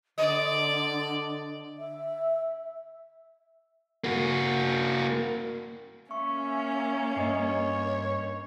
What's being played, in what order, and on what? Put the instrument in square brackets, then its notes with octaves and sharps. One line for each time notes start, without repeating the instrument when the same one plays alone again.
[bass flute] D3 [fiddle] D5 [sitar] D#5
[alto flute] E5
[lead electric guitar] A#3 F#4
[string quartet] A#3 C#4 [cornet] E5 [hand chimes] C#6
[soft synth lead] G2 [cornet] C#5 [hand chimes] D#5 C7